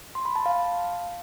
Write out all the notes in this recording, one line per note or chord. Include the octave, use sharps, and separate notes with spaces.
C6
B5
A5
F5